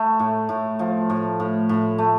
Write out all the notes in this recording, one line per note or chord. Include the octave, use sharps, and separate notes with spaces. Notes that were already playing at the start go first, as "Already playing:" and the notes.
Already playing: A3
A2
A2
F3
A2
A2
A2
A3